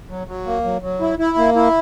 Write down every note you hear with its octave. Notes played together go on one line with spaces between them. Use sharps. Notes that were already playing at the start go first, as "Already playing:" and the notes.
F#3
F#3
A#3
F#3
F#3
E4
E4
A#3
E4